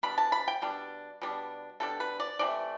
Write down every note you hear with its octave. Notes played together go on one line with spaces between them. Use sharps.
B2 G3 D4 B5
A5
B5
G5
B2 G3 D4
B2 G3 D4
B2 G3 D4 A4
B4
D5
C3 E3 A3 D5